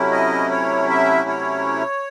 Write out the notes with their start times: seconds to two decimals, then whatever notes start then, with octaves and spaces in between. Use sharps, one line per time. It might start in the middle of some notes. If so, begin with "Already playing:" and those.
Already playing: C3 F#3 A3 C#4 E4
0.12 D#5
0.51 C#5
0.90 E5
1.29 C#5